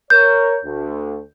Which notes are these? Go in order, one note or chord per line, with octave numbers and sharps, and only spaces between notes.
A#4 C#5 G6
D2